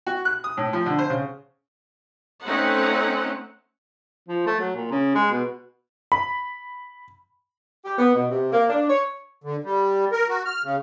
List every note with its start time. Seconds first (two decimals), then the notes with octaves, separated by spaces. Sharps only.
0.07 F#4
0.25 F#6
0.44 D#6
0.57 A2
0.73 F3
0.86 D3
0.99 C5
1.10 C#3
2.44 A3 C4 C#4 D#4 F#5
4.29 F3
4.47 A3
4.60 F#3
4.76 A#2
4.91 C#3
5.15 G#3
5.32 B2
6.12 B5
7.85 G4
7.97 B3
8.14 B2
8.30 C3
8.52 A#3
8.69 D4
8.89 C#5
9.44 D3
9.64 G3
10.12 A#4
10.29 F#4
10.45 F6
10.63 C#3